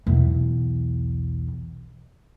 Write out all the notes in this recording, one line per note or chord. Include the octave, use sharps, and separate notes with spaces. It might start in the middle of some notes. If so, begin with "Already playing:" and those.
B1 E2